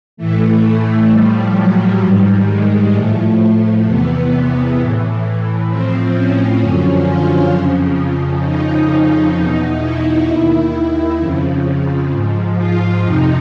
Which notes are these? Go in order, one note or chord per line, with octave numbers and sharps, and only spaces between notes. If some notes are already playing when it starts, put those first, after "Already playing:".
A2 E3 A3
A2 F3 G3
F#3
G#2 D#3 G3
G#3
A2 F3 A3
E2 C3 E3 B3
A2 E3
A2 F3 C4
C#4
F#2 D3 F3 C#4
F4
F2 C#3 F3
F2 C#3 F3 D#4
E2 B2 D#4
E4
D#2 D#3 E4
F2 C#3 F3
G#2 F3
F4
F2 C3 F3 D#4